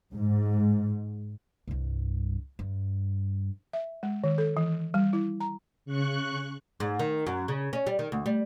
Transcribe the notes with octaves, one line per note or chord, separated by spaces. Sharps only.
G#2
C2 G2
G2
E5
G#3
D#3
A4
E3
G3
E4
A#5
C#3 C#6 F#6
G#2
D#3
F#2
C#3
C#4
G3
D#3
D2
G3